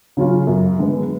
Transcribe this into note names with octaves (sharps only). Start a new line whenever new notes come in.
C#3 F#3 C#4 F4
F#2
D3 G#3 B3